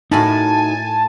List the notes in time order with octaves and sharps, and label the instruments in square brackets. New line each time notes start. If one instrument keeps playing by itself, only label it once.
[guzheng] A2 A#4 B5 [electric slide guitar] D#4 F#4 [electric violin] G#5 [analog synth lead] A5